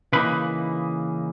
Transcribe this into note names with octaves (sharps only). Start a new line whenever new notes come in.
C#3 E3 A#3 D#4 B4 B5